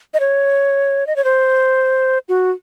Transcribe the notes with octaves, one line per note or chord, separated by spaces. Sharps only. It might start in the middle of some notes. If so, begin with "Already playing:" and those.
D#5
C#5
D#5
C#5
C5
F#4